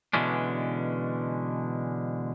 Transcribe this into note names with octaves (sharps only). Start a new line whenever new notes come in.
B2 D3 E3 G#3 C#4 D4